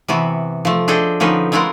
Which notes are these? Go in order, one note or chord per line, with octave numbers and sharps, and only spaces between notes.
C3 E3 B3 F#4
F3 A3
D4 G#4 A4 D#5 G5
D3 F3 C#4 D#4 B4
G#3 A3 E4 F4 A#4 F#5